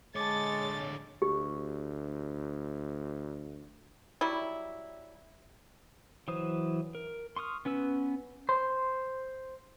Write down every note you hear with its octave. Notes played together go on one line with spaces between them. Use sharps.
D3 G#3 C#5 A5 D6 A6
D2 G4
F#3 G3 E4
E3 F#3 C5 D#6
A#4
C6 C#6 D#6 F6
B3 C#4 B4 E6
C5